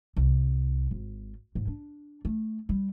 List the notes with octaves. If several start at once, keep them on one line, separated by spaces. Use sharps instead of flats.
C2
G#1
G#2
D4
A3
G3